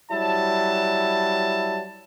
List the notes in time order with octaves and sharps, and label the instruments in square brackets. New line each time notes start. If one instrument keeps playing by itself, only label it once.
[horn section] F#3 G3 E4 A5